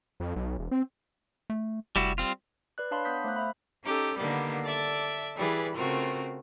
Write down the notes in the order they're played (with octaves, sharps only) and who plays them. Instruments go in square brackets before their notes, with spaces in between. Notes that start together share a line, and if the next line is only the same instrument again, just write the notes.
[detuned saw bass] F2
B1
E1
C4
[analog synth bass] A3
[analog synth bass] F1 [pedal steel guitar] G3 E4 F#4
[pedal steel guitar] G3 C4 F4
[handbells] B4 D5 F#6
D4 C#5 F5 A5 B5 C6
B3 C6 D#6 G6 B6
A3 C5 F5 F#6
E5 B5
[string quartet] C#4 D#4 G4 A4
D3 D#3 G3 A#3 B3
A4 D5 E5 A5
E3 G3 G#4 B4 A6
C#3 A3 C4 F4 F#4 A#4